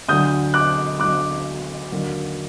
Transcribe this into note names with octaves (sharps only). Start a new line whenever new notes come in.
D2 D3 F#3 D#6 G6
D6 F#6
D2 D3 F#3 D6 F#6
D#2 D3 F#3